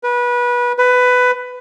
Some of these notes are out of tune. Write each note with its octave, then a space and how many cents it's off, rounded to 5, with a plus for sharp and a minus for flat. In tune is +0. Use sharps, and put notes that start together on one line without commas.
B4 -25
B4 +15